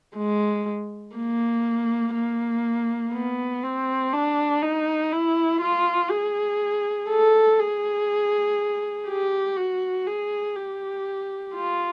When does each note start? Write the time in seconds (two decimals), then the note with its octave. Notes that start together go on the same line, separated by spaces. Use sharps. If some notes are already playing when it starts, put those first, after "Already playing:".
0.17 G#3
1.16 A#3
2.15 A#3
3.13 B3
3.63 C4
4.13 D4
4.62 D#4
5.12 E4
5.62 F4
6.11 G#4
7.10 A4
7.59 G#4
9.08 G4
9.57 F#4
10.07 G#4
10.56 G4
11.55 F4